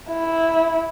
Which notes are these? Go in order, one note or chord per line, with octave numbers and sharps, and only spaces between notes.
E4